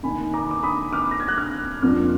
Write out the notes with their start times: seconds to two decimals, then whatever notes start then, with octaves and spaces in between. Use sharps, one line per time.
0.03 D#3 A#3 D#4 G#5 B5
0.34 A#5 D6
0.51 D6
0.63 B5 D#6
0.93 D6 F6
1.11 A#6
1.20 G#6
1.28 F#6
1.38 D6 F6
1.82 F2 F3 A#3 D4 D6 F6